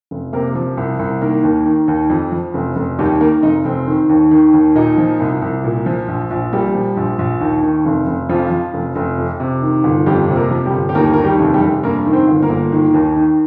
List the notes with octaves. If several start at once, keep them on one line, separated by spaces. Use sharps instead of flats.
F1
C3 A#3 A#4
F3
C2
C2
D#3 A#3 A#4
D#2
D#3
D#2
F2
F3
F1
F1
D#2 G3 G4
D#3 A#3 A#4
F1 D#4
F1 C4
D#3
D#2
D#3
D#2
A#2 D#4
F3
C2
C2
A#2
F3
A#1
A#1
A#2 G3 G4
F3
A#1
A#1
D#2
D#3
F1
F1
F2 F3 F4
F3
F1
F1
F2
C3
D#3
G1
F2 G3 G4
C3
A#3 A#4
F3
G3 G4
G1
G4
D#2 A#3 A#4
D#3 A#4
G3 G4
F1
G3 G4
F1
G2 A#3 A#4
D#3
C4 C5
G1
A#3 A#4
G1
D#3
D#2
D#3